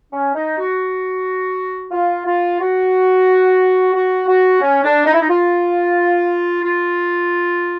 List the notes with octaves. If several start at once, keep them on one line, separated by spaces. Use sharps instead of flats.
C#4
D#4
F#4
F4
F4
F#4
F#4
F#4
C#4
D4
D#4
E4
D#4
F4
F4